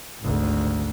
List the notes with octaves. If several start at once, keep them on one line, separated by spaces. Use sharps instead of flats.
G#1 D2